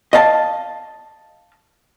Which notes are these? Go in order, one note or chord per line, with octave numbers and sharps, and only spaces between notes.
D#5 F5 A5